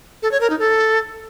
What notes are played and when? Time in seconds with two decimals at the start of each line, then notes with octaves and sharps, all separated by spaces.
0.22 A4
0.32 C#5
0.41 A#4
0.50 D#4
0.59 A4